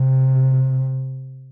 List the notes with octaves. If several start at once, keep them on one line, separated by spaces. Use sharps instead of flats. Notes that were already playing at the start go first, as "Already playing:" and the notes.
Already playing: C3